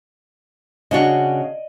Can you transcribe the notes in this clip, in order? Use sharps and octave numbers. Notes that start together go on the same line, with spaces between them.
C#3 D4 F#4 D5 D#5